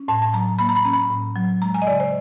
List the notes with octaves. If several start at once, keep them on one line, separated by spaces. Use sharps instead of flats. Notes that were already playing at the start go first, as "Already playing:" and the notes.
Already playing: C#4
A2 A5
A5
F#3 A#5
A#3 B5
A#5
B5
C#4 A#5
B5
A2
F#3
G#3 A#5
G#5
D#5
C#3 D5
C5